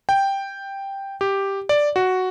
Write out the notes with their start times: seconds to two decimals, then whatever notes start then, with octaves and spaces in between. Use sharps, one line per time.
0.09 G5
1.21 G4
1.69 D5
1.96 F#4